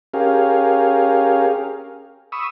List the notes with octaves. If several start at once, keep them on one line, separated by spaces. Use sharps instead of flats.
C#4 G4 G#4 A#4 F5
B5 C#6 D#6 E6